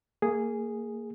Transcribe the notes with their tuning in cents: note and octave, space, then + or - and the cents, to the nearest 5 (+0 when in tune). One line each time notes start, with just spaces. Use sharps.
A#3 -20 G#4 +0